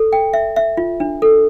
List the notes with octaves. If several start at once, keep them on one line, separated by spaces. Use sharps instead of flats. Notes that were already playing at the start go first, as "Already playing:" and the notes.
Already playing: A4
G5
E5
E5
F4
D4
A4